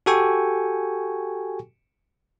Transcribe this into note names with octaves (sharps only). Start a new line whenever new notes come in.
F#4 G4 A4 G5 G#5 C#6